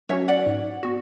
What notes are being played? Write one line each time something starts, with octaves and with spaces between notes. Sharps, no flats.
F#3 C#4 F#4 C#5 E5
D5 F#5
G#2
B3 F#4